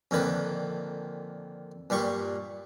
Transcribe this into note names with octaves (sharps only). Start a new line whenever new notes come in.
F2 A#2 D3 D#3 B4
G2 A#2 G3 C#6